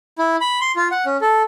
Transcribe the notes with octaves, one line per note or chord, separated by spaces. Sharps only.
E4
B5
C6
F4
F#5
C#4
A4